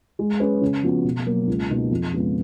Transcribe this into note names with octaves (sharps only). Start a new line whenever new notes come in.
G#3
C#4 G#4 B4
C#3
F3 B3 F#4
B2
F#3 A#3
C#2
B2 A#3 D#4
F2
C#3 G#3 B3 F4